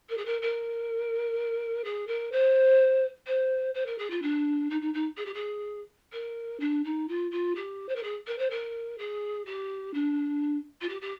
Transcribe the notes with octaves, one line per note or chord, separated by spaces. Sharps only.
A#4
G#4
A#4
A#4
G#4
A#4
C5
C5
C5
A#4
G#4
F4
D4
D#4
D#4
D#4
G#4
G4
G#4
A#4
D4
D#4
F4
F4
G4
C5
A#4
G#4
A#4
C5
A#4
G#4
G4
D4
F4
G4
G4